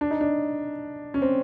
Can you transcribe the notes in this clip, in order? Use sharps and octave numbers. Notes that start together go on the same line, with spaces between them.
D4
D#4
D4
C#4
C4